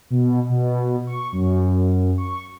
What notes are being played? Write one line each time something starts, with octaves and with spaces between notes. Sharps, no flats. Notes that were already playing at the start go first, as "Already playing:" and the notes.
B2
B2
C#6
F#2
C#6